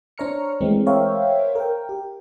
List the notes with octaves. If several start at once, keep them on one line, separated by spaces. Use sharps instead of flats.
D4 C5 C#5 A#5 F6 C#7
E3 G#3 A3 C4
A#4 C5 C#5 E5 F5 G5
A#4 G5
G4